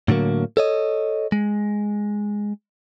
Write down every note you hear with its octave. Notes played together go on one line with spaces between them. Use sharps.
A2 D3 F#3 A#3
A4 C#5 D#5
G#3